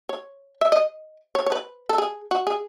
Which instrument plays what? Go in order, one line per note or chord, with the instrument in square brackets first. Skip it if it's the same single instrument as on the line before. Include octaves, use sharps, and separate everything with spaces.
[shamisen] C#5
E5
D#5
C#5
C#5
B4
A4
G#4
F#4
G#4